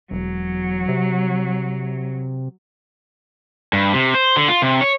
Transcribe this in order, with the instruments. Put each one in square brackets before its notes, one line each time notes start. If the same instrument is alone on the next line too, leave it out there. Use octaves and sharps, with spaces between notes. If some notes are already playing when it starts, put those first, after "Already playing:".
[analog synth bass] E1 [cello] F#3
[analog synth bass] C3
[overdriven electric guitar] G2
C3
C5
D3
F4
C3
C#5